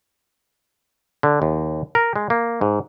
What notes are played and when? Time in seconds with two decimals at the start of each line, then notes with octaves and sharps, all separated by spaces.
1.23 D3
1.42 D#2
1.95 A#4
2.16 G#3
2.30 A#3
2.61 G#2